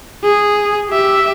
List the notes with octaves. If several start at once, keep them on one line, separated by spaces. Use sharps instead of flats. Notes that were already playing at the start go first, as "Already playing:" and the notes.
G#4
G4 E5